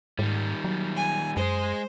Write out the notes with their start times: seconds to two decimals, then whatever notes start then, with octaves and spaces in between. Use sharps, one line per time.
0.19 G#2 D#3 G3
0.64 F#3
0.97 G#5
1.37 F#2 G#3 G#4 C5